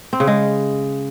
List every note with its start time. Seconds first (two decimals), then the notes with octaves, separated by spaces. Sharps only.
0.13 C4
0.20 C#3
0.27 G#3